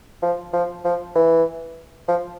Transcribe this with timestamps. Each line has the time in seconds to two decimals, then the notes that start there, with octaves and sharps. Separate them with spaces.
0.22 F3
0.53 F3
0.85 F3
1.15 E3
2.08 F3